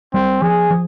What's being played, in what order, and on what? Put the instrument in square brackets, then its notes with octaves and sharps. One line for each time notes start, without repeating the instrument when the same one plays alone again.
[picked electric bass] G3 [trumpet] C4
[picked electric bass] F3 [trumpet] G#4
[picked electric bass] F3